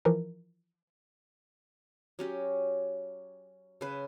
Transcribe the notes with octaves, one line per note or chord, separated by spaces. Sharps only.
E3 F3 A#4
F#3 C#4 G4
C#3 B4